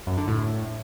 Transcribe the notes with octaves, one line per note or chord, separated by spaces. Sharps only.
F#2
D3
A2